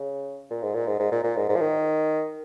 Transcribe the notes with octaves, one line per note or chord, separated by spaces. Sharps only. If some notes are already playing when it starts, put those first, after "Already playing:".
Already playing: C#3
A#2
G#2
A#2
G#2
G#2
A#2
A#2
G#2
G#2
F3
D#3